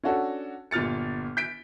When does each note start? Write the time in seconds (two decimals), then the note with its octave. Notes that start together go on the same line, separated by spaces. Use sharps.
0.03 C#4 D4 F#4 A4
0.71 G1 A#2 F6 A6 C#7
1.37 G6 B6 D7